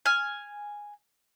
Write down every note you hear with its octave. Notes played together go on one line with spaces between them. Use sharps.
G#5 F6